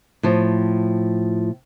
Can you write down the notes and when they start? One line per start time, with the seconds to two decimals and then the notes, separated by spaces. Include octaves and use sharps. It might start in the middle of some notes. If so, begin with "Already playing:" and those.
0.23 A2 F3